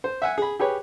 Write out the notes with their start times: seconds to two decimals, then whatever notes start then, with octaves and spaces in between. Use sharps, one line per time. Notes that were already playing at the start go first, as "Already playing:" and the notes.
0.04 C5
0.22 E5 F#5 G#5
0.38 G#4 B5
0.59 G4 G#4 B4 C#5